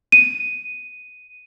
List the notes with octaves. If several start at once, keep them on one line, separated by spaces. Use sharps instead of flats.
D#7